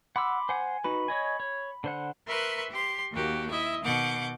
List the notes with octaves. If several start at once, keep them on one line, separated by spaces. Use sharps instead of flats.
F#5 B5 C6 D6 E6
C5 F#5 G#5
D#4 F#4 B4 B5
C#5 D#5 G#5
C#5
D3 C5 F#5
A#4 B4 E5 C6 C#6 F#6
G4 C6
D#2 A#3 F#4 G4
E4 D#5 E5
B2 D#3 F#5 D6 G6